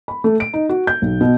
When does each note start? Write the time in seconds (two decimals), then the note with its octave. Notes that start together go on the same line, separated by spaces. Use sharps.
0.08 B5
0.24 A3
0.40 D7
0.54 D#4
0.69 F#4
0.87 G6
1.02 B1
1.21 B2